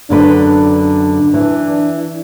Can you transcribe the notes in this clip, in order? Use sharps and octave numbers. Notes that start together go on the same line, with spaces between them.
F#2 D3 D4 B4
E3